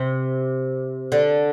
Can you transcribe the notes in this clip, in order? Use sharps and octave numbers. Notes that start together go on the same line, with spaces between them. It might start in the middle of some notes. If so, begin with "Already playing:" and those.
Already playing: C3
D3